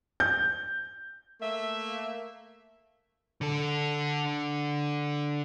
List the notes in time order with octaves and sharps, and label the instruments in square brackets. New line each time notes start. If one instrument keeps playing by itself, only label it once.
[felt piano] G6
[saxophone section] A3 A#3 E5
[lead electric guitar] D3 A4